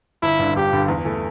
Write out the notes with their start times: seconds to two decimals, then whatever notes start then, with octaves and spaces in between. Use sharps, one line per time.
0.22 G1 E4
0.39 G2 D3
0.56 G1 G4
0.73 G2 D3
0.88 E2
1.05 E3 A3